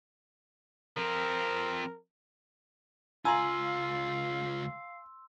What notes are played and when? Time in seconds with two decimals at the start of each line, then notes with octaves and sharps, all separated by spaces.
0.97 F3 C4 A#4
3.25 C#2 F4 F5 G#5 A#5 C6 E6